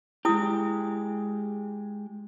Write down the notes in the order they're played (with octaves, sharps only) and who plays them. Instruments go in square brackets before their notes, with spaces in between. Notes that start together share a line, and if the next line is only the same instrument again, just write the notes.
[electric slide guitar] G#3 G4 [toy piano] E4 D#6